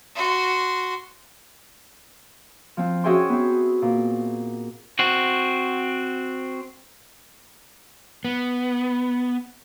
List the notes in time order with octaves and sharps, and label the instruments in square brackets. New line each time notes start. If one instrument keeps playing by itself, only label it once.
[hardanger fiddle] F#4 C6
[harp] F3 C4
C#4 F#4 G#4 E5 G5 C6
B3 C4
A#2
[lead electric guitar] C4 F#4
[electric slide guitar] B3